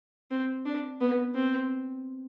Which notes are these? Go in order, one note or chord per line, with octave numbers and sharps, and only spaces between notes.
C4
D4
B3
C4